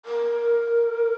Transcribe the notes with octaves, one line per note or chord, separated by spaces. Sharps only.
A#4